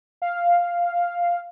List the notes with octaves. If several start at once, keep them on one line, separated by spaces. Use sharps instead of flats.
F5